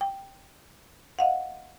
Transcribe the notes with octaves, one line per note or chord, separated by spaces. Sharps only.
G5
D#5 F5 F#5